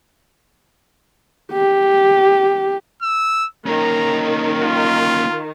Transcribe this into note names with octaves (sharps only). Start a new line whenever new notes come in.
G4
E6
D#3 A#3 C#4 A#5
F4